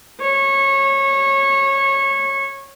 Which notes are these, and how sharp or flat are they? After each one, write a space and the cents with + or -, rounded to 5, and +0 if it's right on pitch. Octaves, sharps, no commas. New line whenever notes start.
C#5 -20